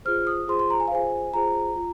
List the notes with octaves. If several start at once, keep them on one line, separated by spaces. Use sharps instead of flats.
F4 G#4 C5 F6
D#6
F4 G#4 C5 C6
C6
A#5
G#5
F5
F4 G#4 C5 G#5
F4 G#4 C5 A#5
F4